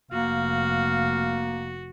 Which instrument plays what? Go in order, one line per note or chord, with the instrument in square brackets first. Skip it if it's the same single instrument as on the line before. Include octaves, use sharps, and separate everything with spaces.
[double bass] F1 [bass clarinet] A#3 [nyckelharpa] F#4 [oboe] F5